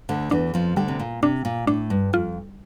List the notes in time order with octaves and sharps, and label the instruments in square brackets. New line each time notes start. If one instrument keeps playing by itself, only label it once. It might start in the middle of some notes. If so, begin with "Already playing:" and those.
[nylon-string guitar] D2 D3
[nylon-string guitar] E2 E3 [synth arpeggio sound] D4
[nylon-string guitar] F2 F3
[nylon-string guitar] D2 D3 [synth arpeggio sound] G3
[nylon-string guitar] C3
A#2
[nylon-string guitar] C3 [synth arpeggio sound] D4
[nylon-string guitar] A#2
[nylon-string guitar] A2 [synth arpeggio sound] D4
[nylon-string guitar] G2
[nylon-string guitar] F2 [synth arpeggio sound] F4